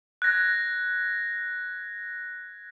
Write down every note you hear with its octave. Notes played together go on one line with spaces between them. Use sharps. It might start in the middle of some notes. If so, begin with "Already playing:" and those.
F#6 G#6 A#6